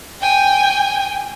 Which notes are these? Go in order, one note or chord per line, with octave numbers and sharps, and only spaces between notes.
G5 G#5